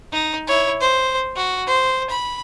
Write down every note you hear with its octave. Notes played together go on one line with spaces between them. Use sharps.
D#4
E4 C#5
C5
F#4
C5
B5